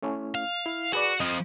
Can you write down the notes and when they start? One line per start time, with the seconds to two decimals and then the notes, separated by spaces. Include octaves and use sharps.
0.02 A3 C#4 E4
0.35 F5
0.66 E4
0.93 F#4 G#4 B4 D5
1.20 F2 F3 D#5